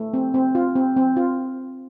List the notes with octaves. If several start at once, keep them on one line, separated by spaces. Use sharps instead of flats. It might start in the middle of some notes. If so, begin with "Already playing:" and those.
Already playing: A3
C4
C4
F4
C4
C4
F4